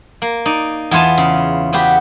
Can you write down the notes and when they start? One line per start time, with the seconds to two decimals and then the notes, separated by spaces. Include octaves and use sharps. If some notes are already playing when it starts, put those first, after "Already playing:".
0.22 A#3
0.46 D#4 D5
0.91 E2 B3 F4 G#5 A5
1.18 C#3
1.73 C#3 B3 F#4 G4 B4